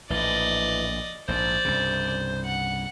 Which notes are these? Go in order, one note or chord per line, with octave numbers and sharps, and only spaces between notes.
A#1 A2 E3 D5 D#5
A#1 G#2 C5 D5
C2 G2 C#3
F#5